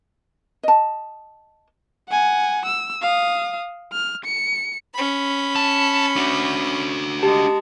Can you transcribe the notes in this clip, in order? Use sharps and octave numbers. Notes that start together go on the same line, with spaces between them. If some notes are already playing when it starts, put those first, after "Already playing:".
D#5 A5
F#5 G#5
E6
F5 D#6
F6
C#7
C#4 B5
A5
D4 F#4
G#3 G4 A5